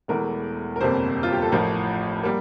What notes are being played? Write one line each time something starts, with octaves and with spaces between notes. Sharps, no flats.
E1 E2 E3 A3 A#4
A#4
G1 F2 C3 G3 A#3 C5
F4
G4
A4
A1 A2 F3 A#4
G3 A#3